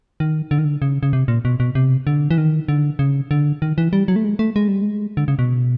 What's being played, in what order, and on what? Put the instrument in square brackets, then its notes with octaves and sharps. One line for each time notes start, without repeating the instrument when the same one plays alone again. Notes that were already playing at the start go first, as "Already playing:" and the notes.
[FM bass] D#3
D3
D#3
D3
C#3
C#3
C3
A#2
B2
B2
C3
D3
E3
D#3
D3
C#3
D3
D#3
E3
G3
F#3
A3
G#3
A3
G#3
G3
G#3
D3
C#3
B2